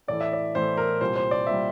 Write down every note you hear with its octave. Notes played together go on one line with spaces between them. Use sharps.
A2 E3 A3 E4 D5
E5
D5
A2 E3 A3 E4 C5
A#4
C2 A#2 G3 C5
C5
D5
A#2 G3 E5